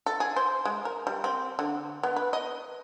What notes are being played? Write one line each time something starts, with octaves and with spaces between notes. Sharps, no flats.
A4
G#4
C5
G#3
A#4
G3
C4
D3
B3
B4
D#5